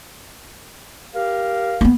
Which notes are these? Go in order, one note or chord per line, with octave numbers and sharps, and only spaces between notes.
G4 A#4 F5
A#3 B3